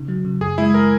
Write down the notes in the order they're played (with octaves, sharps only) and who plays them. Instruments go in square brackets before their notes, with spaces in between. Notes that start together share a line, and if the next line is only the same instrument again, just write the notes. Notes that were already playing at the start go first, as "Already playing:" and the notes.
Already playing: [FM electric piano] C#3 D#4
F#3
C#3
[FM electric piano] F#2 [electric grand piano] G#4
[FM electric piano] G#3 [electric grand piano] E4
[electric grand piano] A#4